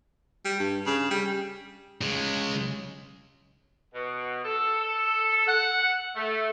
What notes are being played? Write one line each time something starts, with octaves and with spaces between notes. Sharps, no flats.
G3
G2
C#3
G3
C#3 G#3
B2
A4
F#5
A3